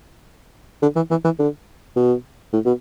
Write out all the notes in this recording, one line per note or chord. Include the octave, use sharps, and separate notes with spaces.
D3
E3
E3
E3
D3
B2
A2
B2